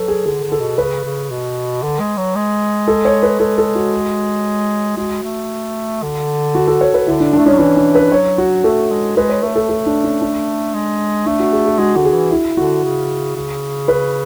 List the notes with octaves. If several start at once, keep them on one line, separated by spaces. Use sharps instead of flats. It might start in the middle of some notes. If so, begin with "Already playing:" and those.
Already playing: F#3 A4 B4
G#4
D3 G#4
D3
A4
B2
C#3 B4
C#3
B2
D3
G#3
F#3
G#3
A4
C#5
B4
G#3 A4
A4
F#4
G#3 F#4
A3
D3
F#4
A4
C#5
B4
D3 E4
D4
A3 D4
G#3 C#4
F#3
E3 D4
D4
B4
F#3 C#5
F#4
A3 A4
G#3
G#3 B4
C#5
A3 B4
A4
A4
D4
C#4
D4
G#3
A3 D4
F#4
G#4
G#4
G#3 F#4
D3 F#4
G#4
E3
E4
D3 F#4
C#3
C#3
B4